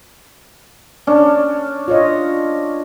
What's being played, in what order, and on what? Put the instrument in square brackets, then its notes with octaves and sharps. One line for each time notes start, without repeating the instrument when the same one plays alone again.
[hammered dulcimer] C#4 D4
[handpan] F4 C#5 D#5